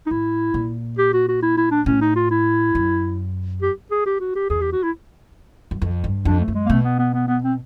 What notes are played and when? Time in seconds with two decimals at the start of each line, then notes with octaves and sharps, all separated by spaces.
0.06 D#4
0.11 A2 E4
0.54 A#2
0.98 G4
1.14 F#4
1.28 F#4
1.42 E4
1.57 E4
1.71 D4
1.86 A2 C#4
2.01 D#4
2.16 F4
2.31 E4
2.75 F#2
3.62 G4
3.91 G#4
4.06 G4
4.20 F#4
4.36 G4
4.50 E2 G#4
4.61 G4
4.73 F#4
4.83 E4
5.71 F#2
5.82 F2
6.04 G2
6.25 F2 D4
6.40 A3
6.48 F#2
6.55 G#3
6.66 A#3
6.69 B2 A3
6.84 B3
6.99 B3
7.14 B3
7.28 B3
7.43 C4